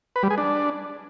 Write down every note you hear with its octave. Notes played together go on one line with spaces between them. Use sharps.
B4
G3
G#4
D4